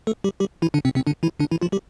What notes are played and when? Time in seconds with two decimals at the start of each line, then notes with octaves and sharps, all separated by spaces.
0.07 A3 A4
0.24 G3 G4
0.40 G3 G4
0.62 E3 E4
0.74 D3 D4
0.85 C3 C4
0.95 C3 C4
1.07 D3 D4
1.23 E3 E4
1.40 D3 D4
1.51 E3 E4
1.62 F3 F4
1.72 G3 G4